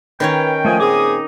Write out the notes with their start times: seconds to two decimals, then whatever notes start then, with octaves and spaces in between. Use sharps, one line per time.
0.20 D#3 C#4 B4 C#5 G5
0.65 F3 A3 D#5 G#5
0.80 A#2 C4 D#4 G#4 D#5 D6 D#6